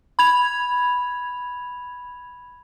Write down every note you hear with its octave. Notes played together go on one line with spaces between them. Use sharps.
B5 G#6 F7